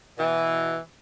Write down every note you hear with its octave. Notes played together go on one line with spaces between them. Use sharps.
B2 E3